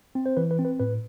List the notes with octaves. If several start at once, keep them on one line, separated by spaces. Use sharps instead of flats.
C4
C5
E3 B4
B4
C4
B4
A2 B4